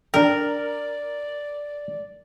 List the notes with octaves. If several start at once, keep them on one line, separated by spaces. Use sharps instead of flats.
D4 A#4 D5 G5